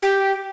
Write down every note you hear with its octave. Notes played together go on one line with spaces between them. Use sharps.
G4